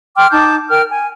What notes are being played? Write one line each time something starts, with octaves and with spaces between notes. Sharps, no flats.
G5 C6 D6 F6
D#4 A5 D6 G6
A#4 G5 F6
G#5